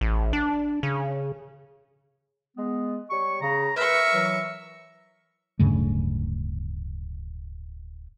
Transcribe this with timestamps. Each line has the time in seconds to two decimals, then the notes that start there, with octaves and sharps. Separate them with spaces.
0.01 A1
0.33 D4
0.83 C#3
2.57 G#3 B3
3.10 G3 C#5 C#6
3.41 C#3 A#5
3.76 A#4 B4 E5 C#6
4.14 E3 F#3
5.59 D1 G2 C#3 A3